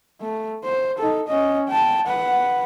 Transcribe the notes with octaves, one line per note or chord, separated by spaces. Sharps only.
A3
C5
D#4 A4
C#4 D#5
G5 A5
B4 F#5